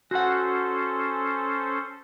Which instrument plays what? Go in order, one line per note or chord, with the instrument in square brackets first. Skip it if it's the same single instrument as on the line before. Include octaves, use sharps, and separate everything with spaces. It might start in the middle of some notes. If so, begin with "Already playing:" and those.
[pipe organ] C#4 A4 C5 [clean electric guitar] F#4 F#5